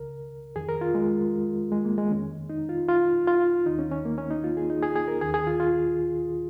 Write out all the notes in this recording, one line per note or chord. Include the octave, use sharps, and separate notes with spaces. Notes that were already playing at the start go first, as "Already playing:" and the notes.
Already playing: C#2 C#3 A#4
F2 D#3 G#4
A#4
F4
G#3
G#3
A#3
G#3
F2 D#3 C#4
D#4
F4
F4
F4
D#2 D#3 D#4
C#4
C#4
A#3
C#4
D#4
F4
G#4
D#4
G#4
G#4
A#4
D#2 D#3 G#4
G#4
F4
F4